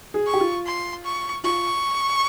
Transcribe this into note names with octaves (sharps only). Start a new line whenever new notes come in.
G#4
C#6
G4
F4
C6
C#6
F4 C#6